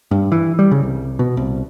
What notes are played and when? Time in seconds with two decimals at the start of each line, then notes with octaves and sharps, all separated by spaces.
0.11 G2
0.32 E3
0.59 G3
0.71 C#3
0.83 C2
1.19 B2
1.37 C2